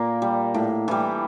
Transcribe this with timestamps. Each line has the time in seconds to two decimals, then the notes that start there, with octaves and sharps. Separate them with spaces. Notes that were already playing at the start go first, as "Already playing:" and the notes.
Already playing: A#2 A#3
0.22 G3
0.54 A2
0.88 E3 G3